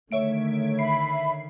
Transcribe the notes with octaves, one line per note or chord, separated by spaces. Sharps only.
D3 D#3 A3 C#5 E5 D7
E5 B5 C7